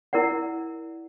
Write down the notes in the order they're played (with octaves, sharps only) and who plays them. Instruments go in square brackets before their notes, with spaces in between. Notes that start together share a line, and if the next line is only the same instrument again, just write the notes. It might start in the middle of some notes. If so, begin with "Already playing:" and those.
[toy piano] E4 A#4 D5 F#5